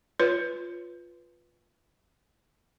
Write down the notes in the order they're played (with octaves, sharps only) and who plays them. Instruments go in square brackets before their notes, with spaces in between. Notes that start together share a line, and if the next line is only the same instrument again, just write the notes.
[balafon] F4 B4 C#5